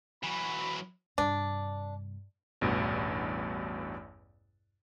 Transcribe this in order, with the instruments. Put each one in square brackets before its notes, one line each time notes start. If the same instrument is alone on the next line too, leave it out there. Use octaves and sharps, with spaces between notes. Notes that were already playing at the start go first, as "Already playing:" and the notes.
[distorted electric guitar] E3 F#3 [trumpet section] F#4 B5
[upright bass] G2 C3 [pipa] D4
[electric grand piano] A1 E2 G2 B2